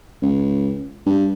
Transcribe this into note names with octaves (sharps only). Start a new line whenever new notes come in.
C#2
G2